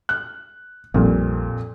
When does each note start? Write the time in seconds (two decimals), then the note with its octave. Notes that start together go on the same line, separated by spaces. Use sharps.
0.09 F#6
0.94 A#1 F2 A#2 G3